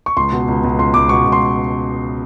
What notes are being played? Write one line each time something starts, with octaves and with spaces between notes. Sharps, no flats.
C#6
C#2 C6
B2
C#2
C#2
C#2 C6
C#2 D6
B2 C#6
C#2
C6